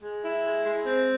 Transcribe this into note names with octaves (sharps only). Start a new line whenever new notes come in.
G#3
E4
G#3
G#3
C4